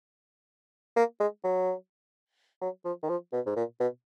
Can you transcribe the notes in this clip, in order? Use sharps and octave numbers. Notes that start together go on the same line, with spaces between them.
A#3
G#3
F#3
F#3
F3
D#3
F3
B2
G#2
A#2
B2